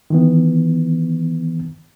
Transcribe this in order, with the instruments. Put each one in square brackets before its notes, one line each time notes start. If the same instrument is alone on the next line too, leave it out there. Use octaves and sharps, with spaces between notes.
[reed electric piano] D#3 E3 B3